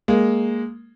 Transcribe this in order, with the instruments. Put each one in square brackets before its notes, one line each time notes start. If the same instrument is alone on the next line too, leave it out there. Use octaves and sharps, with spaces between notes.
[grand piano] G#3 A#3